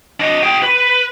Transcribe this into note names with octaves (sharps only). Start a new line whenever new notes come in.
D4 D#5
G#4 G5
B4